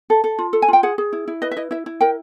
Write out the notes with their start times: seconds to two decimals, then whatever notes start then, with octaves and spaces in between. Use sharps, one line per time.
0.10 A4
0.24 A4
0.39 F4
0.53 A4
0.62 G#5
0.68 F4 G5
0.83 G#4 F#5
0.98 G#4
1.13 E4
1.28 E4
1.42 B4 D#5
1.51 E5
1.57 E4 D#5
1.71 E4 E5
1.86 E4
2.01 A#4 G5